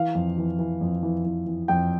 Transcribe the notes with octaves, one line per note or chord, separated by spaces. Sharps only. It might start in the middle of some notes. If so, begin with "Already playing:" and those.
Already playing: E3 F5
F2
E3
E3
F2
E3
E3
E3
F2 G5